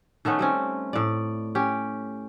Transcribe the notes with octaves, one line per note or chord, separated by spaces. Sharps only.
D#3 A3 B3 C#4
G3 C4 C#4
A2 D5
C#4 G4